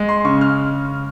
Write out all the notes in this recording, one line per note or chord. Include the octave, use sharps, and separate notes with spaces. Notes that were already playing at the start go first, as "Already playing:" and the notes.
Already playing: G#3
C6
C#3 C#6
F6